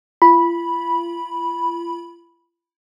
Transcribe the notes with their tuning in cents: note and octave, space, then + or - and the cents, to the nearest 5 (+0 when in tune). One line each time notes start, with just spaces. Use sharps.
F4 -40 B5 -10